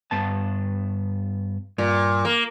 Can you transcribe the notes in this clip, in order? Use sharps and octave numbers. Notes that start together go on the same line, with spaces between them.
G2 B3 A5
G2 A#2
A#3